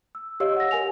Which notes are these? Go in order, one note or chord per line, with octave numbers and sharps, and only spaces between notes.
E6
G4 C#5 D#5 F5 E6
F#5 A#6
A#4 G#5 F7